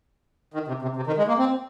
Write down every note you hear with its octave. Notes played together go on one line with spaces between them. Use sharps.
D#3
C3
C3
C3
D#3
G#3
A#3
C4